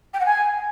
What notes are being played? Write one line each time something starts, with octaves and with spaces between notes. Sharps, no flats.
G5
F#5
G#5